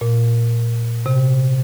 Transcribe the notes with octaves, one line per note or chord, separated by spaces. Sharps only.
A#2
C3